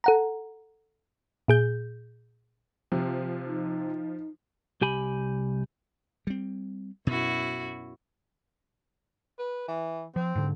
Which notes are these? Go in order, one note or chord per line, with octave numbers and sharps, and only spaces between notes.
A4 F#5 A#5
A#2 G#4 G6
C3 F3
D#4
C2 G4 G#5 B5
G3 C4
F#2 B2 E4 F#4
B4
E3
F3 C4
G#2 D3